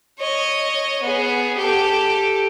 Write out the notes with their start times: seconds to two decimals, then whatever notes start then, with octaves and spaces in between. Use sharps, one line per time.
0.19 C#5 D#5
1.02 B3 G#4
1.57 G4 A4